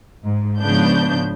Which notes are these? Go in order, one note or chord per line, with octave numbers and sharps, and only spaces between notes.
G#2
G#2 C#3 F3 B3 D4 G6